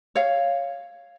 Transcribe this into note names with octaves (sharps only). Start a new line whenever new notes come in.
C#5 F5